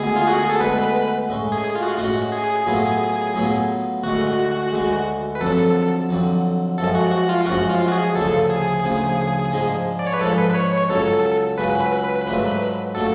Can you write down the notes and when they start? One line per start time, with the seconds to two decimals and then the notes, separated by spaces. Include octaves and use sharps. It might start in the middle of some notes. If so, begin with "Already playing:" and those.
Already playing: D2 D3 G#3 B3 G#4
0.16 F4
0.27 F#4
0.39 G#4
0.49 A4
0.60 D2 D3 G#3 B3 B4
1.29 A2 G#3 C#4
1.52 G#4
1.75 F4
1.82 F#4
1.89 F4
1.97 A2 G#3 C#4 F#4
2.32 G#4
2.66 A2 F#3 B3 F4
3.35 A2 F#3 B3 F4
4.03 D2 D3 G#3 F#4
4.72 D2 D3 G#3
5.35 B4
5.40 F2 D3 F#3 A4
6.09 F2 D3 F#3
6.78 F#2 F3 G#3 A4
6.95 F#4
7.12 F#4
7.29 F4
7.46 F#2 F3 G#3 F#4
7.69 F4
7.88 F#4
7.92 G#4
8.15 D2 C#3 F3 A4
8.50 G#4
8.84 D2 C#3 F3
9.52 G#2 F3 G#3 D4
9.99 D5
10.07 C#5
10.13 B4
10.21 G#2 F3 G#3 D4 A4
10.38 B4
10.50 B4
10.54 C#5
10.72 C#5
10.90 C#2 C#3 F#3 C#4 A4
11.58 C#2 C#3 F#3 C#4 B4
11.81 B4
12.04 B4
12.26 G#2 F#3 A3 D4 F4
12.95 F#3 A3 D4 F4 A4